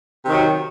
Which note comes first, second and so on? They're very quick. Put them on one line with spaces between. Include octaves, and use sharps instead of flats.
C3 D#3 F#3